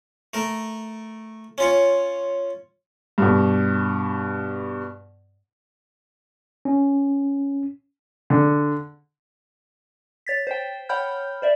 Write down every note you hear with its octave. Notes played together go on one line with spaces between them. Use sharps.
A3 A#4
C#4 F4 C#5
G2 B2
C#4
D3
C#5 A6 B6
C5 G5
C#5 F#5 G5 B5 F6 G6
C5 D5 E5